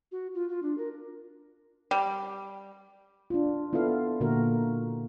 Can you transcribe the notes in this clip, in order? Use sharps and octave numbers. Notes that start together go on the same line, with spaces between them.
F#4
F4
F4
D4
A#4
G3
D4 F4
B3 E4 F4 A4 F5
A#2 D3 A#3 F#4 A#4 F5